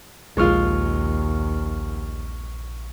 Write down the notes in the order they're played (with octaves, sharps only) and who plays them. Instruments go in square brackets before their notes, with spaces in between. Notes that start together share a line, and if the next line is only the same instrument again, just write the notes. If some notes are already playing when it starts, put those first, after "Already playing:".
[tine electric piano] A#1 C#6 F6 [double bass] D#2 [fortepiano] G#3 F4